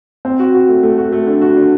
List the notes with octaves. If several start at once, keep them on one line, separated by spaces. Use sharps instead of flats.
C4
F#4
F#4
A3
A3
F#4
A3
D3
F#4
D3